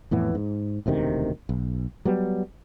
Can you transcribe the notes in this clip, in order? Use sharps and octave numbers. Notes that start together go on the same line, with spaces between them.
F2 A2 E3 B3
G#2
E1 D2 C3 D#3
B1
F#3 G3 B3